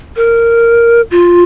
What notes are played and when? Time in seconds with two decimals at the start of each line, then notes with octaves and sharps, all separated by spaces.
0.16 A#4
1.11 F4